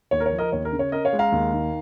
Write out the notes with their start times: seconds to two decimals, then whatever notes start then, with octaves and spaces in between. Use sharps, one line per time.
0.11 D#2 C#5
0.20 A#4
0.26 C#5
0.32 F3
0.38 A#4 D#5
0.52 D#2 C#5
0.65 A#4
0.73 C#3
0.79 C#5
0.92 C#4 A#4 D#5
1.05 C#5 F5
1.13 G#3
1.19 F5 A#5
1.32 D#2
1.52 D#3